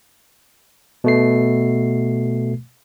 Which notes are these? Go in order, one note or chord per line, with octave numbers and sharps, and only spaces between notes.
B2 A3 C7